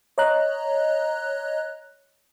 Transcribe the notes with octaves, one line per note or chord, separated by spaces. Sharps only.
C#5 D#5 A#5 F#6